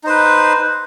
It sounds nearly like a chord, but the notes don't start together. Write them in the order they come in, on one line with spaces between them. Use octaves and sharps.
D#4 C5 B4